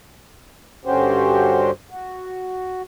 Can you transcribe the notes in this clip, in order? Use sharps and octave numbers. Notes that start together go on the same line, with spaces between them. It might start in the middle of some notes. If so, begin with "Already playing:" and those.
G2 D3 C#4 F#4 G4 C5
F#4